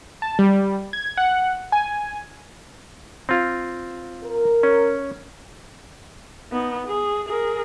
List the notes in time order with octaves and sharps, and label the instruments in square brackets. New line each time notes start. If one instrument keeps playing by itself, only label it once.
[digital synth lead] A5
G3
G#6
F#5
G#5
[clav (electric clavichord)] C4 F4
[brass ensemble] A#4
[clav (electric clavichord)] C#4
[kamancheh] B3 D#4
G#4
G#4 A#4